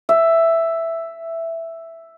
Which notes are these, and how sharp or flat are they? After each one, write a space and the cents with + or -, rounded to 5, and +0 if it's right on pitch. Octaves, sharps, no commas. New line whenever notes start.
E5 +5